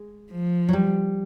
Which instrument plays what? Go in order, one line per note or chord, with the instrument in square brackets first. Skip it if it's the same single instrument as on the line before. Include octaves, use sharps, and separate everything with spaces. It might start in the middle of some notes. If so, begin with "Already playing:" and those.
Already playing: [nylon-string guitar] G#3
[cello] F3
[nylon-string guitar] F#3
G3